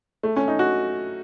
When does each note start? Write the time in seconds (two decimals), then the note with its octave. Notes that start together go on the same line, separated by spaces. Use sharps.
0.23 A3
0.36 C#4
0.48 D#4
0.59 F#4